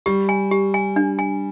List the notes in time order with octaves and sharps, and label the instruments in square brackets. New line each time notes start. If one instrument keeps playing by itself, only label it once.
[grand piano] G3 [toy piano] G4
[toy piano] G#5
G4
G#5
D4
G#5